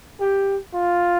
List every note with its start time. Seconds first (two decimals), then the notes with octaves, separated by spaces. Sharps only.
0.20 G4
0.74 F4